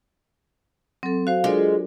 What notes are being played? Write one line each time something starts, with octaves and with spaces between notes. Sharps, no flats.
F#3 C4 A4
F#4 C5 F5
G#3 D4 F4 A4 A#4 D5